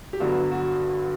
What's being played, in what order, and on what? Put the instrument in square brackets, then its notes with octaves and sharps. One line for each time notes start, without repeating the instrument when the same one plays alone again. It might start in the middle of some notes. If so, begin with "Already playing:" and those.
[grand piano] G4
[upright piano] G2 D3 F#3 B3 [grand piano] F#4
[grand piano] F#4